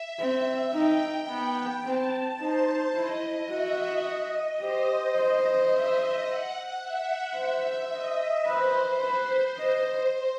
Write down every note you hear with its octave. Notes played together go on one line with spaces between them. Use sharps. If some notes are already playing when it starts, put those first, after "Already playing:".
Already playing: E5
C4 E5
D#4 G5
B3 G5
C4 A5
D#4 C5
E4 D#5
F#4 E5
D#5
G4 C5
C5 D#5
E5
F#5
E5
C5 E5
D#5
B4 C5
B4
D#5